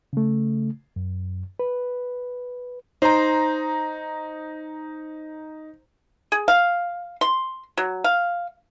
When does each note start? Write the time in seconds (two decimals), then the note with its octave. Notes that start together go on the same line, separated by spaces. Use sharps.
0.13 C#3 A3
0.96 F#2
1.59 B4
3.02 D#4 C5 A#5
6.32 G#4
6.48 F5
7.21 C6
7.77 F#3
8.04 F5